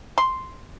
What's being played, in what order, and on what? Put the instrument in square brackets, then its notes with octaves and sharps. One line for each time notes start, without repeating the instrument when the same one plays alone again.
[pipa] C6